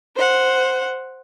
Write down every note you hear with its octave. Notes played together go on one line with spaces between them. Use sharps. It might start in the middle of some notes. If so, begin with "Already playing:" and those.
C5 F#5